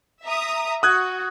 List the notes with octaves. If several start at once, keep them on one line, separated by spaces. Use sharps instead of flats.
E5 A#5 D#6
F#4 D#6 F#6 G#6